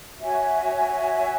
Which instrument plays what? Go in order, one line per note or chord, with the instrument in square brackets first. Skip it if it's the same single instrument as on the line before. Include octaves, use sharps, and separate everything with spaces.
[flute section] F#4 C#5 E5 G#5